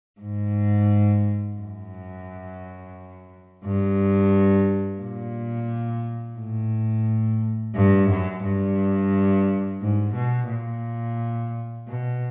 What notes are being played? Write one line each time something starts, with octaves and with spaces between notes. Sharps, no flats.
G#2
F#2
G2
A#2
A2
G2
F#2
G2
G#2
B2
A#2
B2